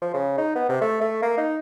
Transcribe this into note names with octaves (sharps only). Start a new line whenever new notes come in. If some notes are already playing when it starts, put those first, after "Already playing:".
F3
C#3
D#4
B3
C3
A3
A3
A#3
D#4